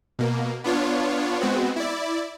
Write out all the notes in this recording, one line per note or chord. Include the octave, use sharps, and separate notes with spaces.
B2 A#3
B3 D4 F4 C#5
G#3 B3 C4 F#4
E4 D5